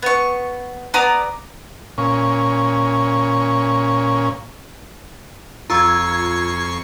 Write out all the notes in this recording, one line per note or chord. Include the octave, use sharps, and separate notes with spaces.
B3 C#6
B3 D5 A#5 D#6
A#2 C#4
F2 F4 A#5 C#6 E6 G#6 C7